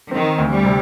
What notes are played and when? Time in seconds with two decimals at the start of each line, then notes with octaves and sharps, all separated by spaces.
0.11 D#3 C4
0.38 D2
0.51 G3
0.64 C3